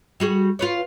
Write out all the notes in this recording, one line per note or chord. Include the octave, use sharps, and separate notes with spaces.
G3 F#4 G#4
F4 B4 C#5